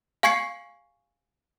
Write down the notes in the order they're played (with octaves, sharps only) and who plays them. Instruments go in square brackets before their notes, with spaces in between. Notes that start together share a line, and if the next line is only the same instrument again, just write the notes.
[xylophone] F5 G#5 C#6 G#6 C7 C#7